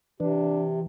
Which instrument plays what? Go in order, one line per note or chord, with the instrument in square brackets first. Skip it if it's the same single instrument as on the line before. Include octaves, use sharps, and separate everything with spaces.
[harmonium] C3 [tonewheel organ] E3 [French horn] D4